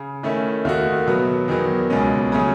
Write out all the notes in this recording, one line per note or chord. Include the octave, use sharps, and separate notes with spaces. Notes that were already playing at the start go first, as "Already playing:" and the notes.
Already playing: C#3
D#3 A3 C#4 E4
D#2 D#3 A3 D#4 F#4
B2 F#3 B3
E2 D#3 F#3 B3
C#2 B2 G#3 C#4
C#3 F#3 A3 C#4